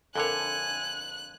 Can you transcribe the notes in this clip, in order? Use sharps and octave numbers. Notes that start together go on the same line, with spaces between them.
F2 D3 A4 A#4 C#5 G#5 F#6